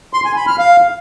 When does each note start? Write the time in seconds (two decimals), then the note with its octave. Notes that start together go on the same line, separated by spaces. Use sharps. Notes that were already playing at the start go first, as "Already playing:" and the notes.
0.13 C6
0.25 G#5
0.36 B5
0.47 F6
0.59 F5